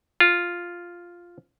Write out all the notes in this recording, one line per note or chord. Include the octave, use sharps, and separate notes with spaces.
F4